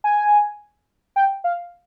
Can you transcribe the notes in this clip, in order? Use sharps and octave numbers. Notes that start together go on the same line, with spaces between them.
G#5
G5
F5